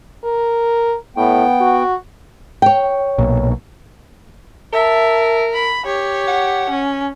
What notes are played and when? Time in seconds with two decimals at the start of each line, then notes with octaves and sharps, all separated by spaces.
0.24 A#4
1.17 A2 B3 G5
1.61 F#4
2.62 C#5 G5
3.18 B1 A#2
4.73 A#4 E5 A5
5.53 B5
5.85 G4 C#5
6.27 F#5
6.70 C#4